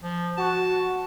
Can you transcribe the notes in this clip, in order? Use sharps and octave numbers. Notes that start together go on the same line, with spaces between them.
F3
F#4 A5